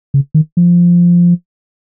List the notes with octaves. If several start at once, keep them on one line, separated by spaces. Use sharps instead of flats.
C#3
D#3
F3